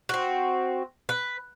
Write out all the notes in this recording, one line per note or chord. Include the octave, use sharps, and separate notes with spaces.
C4 F#4
B4